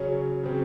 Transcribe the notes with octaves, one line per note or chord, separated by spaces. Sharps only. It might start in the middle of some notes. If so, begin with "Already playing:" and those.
Already playing: C#3 F#3 C#4
C#3 F#3 C4